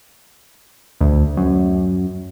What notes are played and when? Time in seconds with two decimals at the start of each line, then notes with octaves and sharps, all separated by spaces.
1.01 D2
1.37 F#2